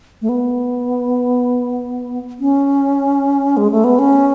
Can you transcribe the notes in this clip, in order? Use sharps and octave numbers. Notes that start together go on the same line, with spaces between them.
A3
B3
C#4
G#3
A3
B3
C#4